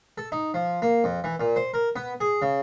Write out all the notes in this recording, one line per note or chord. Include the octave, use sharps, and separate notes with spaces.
A4
D#4
F3
A#3
F2
E3
A#2
C5
A#4
B3
G#4
C#3